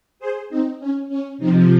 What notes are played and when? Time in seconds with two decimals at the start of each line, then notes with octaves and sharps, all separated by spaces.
0.19 G#4 C5
0.50 C4 D#4
0.80 C#4
1.09 C#4
1.38 C3 F3 C4 D#4